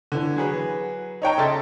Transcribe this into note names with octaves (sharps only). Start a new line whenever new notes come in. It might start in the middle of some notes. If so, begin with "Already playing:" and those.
D3 E3
F#3 G#4 B4
D#4 C#5 G5 A#5
C#3 A4 D#5 E5 C6 A6